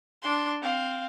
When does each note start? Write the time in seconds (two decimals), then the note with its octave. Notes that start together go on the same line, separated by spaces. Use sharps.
0.22 D4 C6
0.62 C4 F5